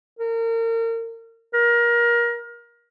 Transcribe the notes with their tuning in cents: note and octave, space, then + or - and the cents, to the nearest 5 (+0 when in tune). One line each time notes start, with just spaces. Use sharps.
A#4 -35
A#4 +25